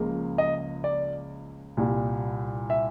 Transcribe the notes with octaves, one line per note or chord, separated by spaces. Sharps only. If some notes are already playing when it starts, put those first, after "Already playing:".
Already playing: C#2 C#3 F3 A#3
D#5
D5
C2 A#2 G3
E5